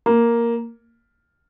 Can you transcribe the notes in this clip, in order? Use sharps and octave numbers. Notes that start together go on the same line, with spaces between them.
A#3